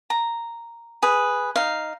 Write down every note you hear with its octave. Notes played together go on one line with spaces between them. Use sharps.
A#5
G#4 B4
D#4 F5